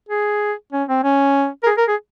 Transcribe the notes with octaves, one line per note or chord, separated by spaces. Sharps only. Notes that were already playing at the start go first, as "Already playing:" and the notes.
G#4
C#4
C4
C#4
A#4
G#4
A#4
G#4